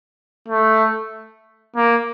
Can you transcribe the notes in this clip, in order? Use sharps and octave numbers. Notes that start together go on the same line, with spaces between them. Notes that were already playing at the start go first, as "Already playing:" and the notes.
A3
A#3